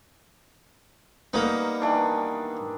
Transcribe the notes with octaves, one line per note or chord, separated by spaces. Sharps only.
G3 A#3 B3 D#4
D#3 E3 D4